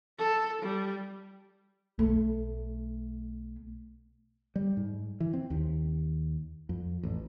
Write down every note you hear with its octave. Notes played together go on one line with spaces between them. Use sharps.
A4
G3
B1 A3
G3
G#2
E3
C4
D#2
F2
A1